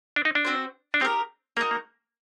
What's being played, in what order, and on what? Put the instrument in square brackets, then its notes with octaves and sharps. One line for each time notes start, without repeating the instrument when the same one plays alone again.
[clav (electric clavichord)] D4
D#4
D4
[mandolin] C4 F#4 C5
[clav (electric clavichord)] D4
[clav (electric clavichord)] C4 [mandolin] D#4 G4 A#4
[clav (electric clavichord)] A#3 [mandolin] D#4 F#4 A#4
[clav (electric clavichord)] A#3